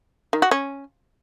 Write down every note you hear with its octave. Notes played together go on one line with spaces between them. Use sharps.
D#3
F#4
C#4